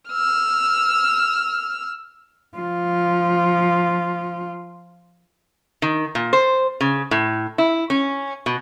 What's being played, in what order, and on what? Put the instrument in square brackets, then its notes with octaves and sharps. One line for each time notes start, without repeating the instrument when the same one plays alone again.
[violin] E6 F6
[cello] F3 F4
[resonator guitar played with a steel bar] D#3
A#2
C5
C#3
A2
E4
C#4
B2